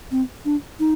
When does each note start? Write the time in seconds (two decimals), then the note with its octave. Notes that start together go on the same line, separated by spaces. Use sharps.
0.11 C4
0.45 D4
0.80 D#4